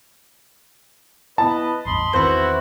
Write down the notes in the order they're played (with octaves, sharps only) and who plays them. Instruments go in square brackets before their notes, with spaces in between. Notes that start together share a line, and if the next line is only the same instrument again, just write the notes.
[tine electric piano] B3 E4 [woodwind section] B4 D#5 [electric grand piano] A5
[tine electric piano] A1 E2 G2 [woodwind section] D#5 B5 C6
[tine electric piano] E2 D#3 C4 [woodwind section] E4 F#4 [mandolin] B4 C5